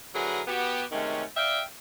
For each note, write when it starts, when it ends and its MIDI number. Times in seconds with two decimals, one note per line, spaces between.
0.15 0.42 50
0.15 0.42 54
0.15 0.42 64
0.15 0.42 68
0.15 0.42 70
0.15 0.42 71
0.47 0.85 59
0.47 0.85 66
0.47 0.85 67
0.92 1.23 48
0.92 1.23 51
0.92 1.23 56
0.92 1.23 57
0.92 1.23 61
1.36 1.62 74
1.36 1.62 76
1.36 1.62 77
1.36 1.62 79